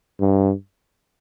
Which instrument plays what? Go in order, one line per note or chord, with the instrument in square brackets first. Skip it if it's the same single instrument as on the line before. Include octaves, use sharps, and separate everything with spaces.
[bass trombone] G2